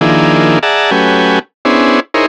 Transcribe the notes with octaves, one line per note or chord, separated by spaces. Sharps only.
D#3 F3 A#3 D4 E4 G#4
G#4 D5 E5 F#5 A5 A#5
F#3 A3 C#4 G4 B4 G#5
B3 C#4 D4 E4 G#4 C5
D#4 E4 G#4 A#4 C5 C#5